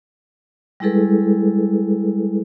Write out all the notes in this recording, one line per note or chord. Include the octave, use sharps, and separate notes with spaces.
G3 G#3 E4 G#4 A4 B4